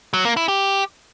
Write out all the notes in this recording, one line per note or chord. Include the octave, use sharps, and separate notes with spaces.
F#3
A#3
E4
G4